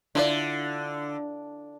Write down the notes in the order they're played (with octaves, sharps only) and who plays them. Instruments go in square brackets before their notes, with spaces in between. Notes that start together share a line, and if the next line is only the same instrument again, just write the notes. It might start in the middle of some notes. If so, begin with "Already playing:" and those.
[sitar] D3 [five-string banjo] E4 F4 D5